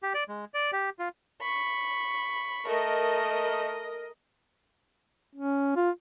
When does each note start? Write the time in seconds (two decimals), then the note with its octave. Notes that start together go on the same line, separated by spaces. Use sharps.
0.03 G4
0.14 D5
0.29 G#3
0.54 D5
0.72 G4
0.99 F4
1.41 B5 C#6
2.67 A3 A#4 D#5
5.36 C#4
5.76 F4